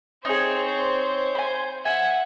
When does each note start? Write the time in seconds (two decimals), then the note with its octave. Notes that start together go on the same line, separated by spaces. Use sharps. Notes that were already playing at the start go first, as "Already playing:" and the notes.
0.25 C4 D#4 G#4 C#5
0.68 C5
1.35 G#5 B5
1.85 E5 F#5 G#5